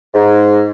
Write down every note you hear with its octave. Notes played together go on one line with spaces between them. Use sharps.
G#2